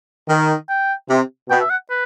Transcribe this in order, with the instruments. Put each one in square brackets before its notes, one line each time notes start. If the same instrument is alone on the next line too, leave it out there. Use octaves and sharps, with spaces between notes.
[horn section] D#3
[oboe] G5
[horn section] C3
[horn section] B2 [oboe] G5
[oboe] E5
F#5
B4